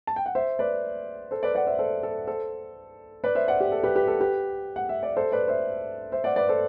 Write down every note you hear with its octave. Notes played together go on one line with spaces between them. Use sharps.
A5
G5
F#5
C5 E5
B4 D5
A4 C5
B4 D5
D5 F#5
C5 E5
A4 C5
A4
A4 C5
B4 D5
C5 E5
D5 F#5
G4
A4
G4 B4
G4 B4
A4
G4 B4
F#5
E5
D5
A4 C5
B4 D5
C5 E5
C5 E5
D5 F#5
B4 D5
A4 C5